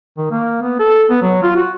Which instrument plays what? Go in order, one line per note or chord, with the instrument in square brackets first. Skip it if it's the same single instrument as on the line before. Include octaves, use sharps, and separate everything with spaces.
[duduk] D#3
A#3
B3
A4
B3
F#3
F4
F#4